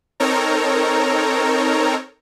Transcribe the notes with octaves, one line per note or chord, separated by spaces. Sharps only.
C4 D#4 A4 A#4 C#5 A#5